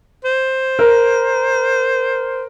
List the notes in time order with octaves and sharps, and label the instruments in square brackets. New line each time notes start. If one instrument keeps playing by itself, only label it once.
[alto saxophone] C5
[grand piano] A#4